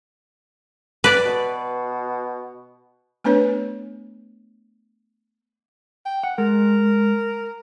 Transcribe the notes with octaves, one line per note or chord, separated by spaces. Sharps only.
B4 D5
B2
A3 B3 D4 B4 C#5
G5
F#5
G#3 A#4